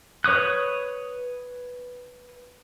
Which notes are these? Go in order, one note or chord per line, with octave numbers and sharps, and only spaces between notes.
B4 C#5 C#6 D#6 F#6